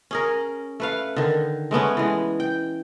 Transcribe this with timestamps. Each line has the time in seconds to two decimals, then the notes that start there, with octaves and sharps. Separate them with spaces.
0.11 C#4 G#4 A#4
0.80 A3 B4 F5
1.16 D3 D#3
1.71 G#3 A3 B3 C#4
1.97 E3 G#3
2.40 G5